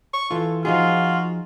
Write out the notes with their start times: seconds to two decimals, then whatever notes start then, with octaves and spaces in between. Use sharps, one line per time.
0.14 C#6
0.31 E3 F4 A4
0.65 F3 D#4 F4 F#4 G#4